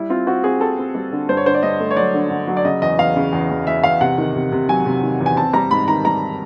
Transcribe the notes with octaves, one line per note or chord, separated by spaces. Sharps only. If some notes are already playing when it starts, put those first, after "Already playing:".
Already playing: G3 E4
C4 F4
C4 F#4
C4 G#4
C4 A4
C4
G3
D3
G2 C5
C#5
D3 C5
D5
G2 D#5
A3
C#5
F#3 D5
D3
D3
F#3
D5
C#3 D#5
E2 D#5
E2 F5
C#3
E2
E2
E2 E5
E2 F5
C3 F#5
D#3
C3
C3
F#3 G#5
C3
D#3
E2
G#5
C4 A5
G3 A#5
G#2 B5
D#3 A#5
G3 A#5